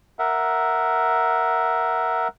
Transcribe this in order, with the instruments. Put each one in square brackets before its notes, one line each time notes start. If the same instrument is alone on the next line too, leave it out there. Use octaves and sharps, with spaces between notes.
[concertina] A#4 E5 F#5